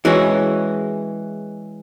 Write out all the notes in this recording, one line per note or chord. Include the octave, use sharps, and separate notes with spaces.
E3 G#3 C#4 F#4